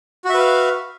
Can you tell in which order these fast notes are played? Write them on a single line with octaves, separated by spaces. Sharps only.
F#4 E5 B4 F5